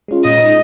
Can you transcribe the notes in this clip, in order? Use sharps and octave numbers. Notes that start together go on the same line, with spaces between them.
G#3 C#4 F4
A#2 D#5
G#3 D#4